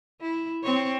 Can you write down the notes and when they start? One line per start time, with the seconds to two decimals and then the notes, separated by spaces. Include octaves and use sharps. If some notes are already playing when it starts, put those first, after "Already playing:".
0.21 E4
0.63 C4 C#5